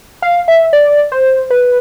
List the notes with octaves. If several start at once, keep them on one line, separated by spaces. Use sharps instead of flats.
F5
E5
D5
C5
B4